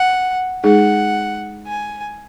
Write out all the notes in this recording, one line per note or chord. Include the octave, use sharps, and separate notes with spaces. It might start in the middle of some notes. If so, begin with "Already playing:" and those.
Already playing: F#5
G#3 D#4 G#4 F#5
G#5